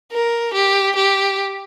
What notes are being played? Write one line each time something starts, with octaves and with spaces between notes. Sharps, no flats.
A#4
G4
G4